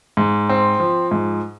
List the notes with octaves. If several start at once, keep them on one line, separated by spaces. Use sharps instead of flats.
G#2
C4
F3
G#2